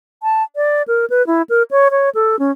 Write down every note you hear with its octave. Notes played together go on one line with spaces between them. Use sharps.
A5
D5
A#4
B4
E4
A#4
C#5
C#5
A4
C#4